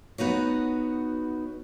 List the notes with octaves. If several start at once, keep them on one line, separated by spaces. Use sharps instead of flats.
B3 D#4 F#4 C#5